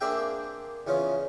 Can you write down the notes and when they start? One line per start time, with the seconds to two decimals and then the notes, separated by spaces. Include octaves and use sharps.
0.01 A#3 C4 D4 G#4 E5 G5
0.87 E2 C#3 C#4 F4